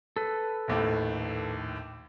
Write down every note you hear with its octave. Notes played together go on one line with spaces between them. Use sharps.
A4 B4
A#1 D#2 A2